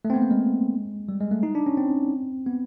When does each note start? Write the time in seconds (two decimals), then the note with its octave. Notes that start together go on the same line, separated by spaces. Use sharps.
0.05 A3
0.10 C4
0.14 B3
0.22 A#3
0.31 G#3
1.09 G3
1.20 G#3
1.31 A3
1.43 D#4
1.55 D4
1.66 C#4
1.77 C4
2.47 B3